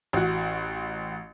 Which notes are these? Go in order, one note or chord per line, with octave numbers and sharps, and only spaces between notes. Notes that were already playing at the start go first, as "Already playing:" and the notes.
A1 F#4